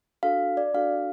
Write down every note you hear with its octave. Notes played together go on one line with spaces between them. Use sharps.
D4 F#4 A4 F5
D5
D4 F#4 A4 F5